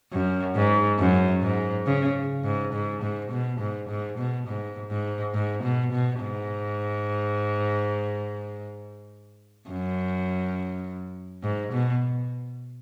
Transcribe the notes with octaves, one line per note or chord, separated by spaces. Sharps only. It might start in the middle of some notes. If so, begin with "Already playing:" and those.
F#2
G#2
F#2
G#2
C#3
G#2
G#2
G#2
B2
G#2
G#2
B2
G#2
G#2
G#2
B2
B2
G#2
F#2
G#2
B2